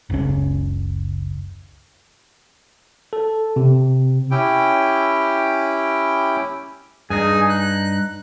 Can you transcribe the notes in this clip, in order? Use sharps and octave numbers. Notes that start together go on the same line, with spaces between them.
F#1 C#2 C#4
A4
C3
C#4 E4 G4 G5
G2 D#4 G#4 G#5
F#6